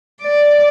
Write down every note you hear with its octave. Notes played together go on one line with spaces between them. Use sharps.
D5